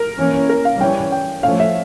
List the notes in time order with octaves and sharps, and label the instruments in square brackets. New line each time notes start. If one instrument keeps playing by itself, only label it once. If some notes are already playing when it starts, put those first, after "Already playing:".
Already playing: [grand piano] A#4
[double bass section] E3 A#3 C#4
[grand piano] A#4
F5
[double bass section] E3 G3 C#4 [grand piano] G5
[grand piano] G5
[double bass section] A2 F3 A3 C#4 [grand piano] F5
[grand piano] E5